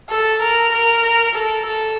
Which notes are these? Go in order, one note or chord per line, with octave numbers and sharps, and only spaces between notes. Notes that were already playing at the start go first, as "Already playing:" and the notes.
A4
A#4
A#4
A4
A4